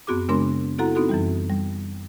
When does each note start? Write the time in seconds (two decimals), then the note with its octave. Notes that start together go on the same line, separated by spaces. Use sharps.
0.07 F#2 B3 C4 F#4 G#4 D6
0.29 C#3 G#3 B3 D4 A#4 C6
0.78 C4 E4 F#4 A4 F#5 A#5
0.95 B3 C4 D#4 F#4 A4
1.09 F#2 E3 G3
1.50 G3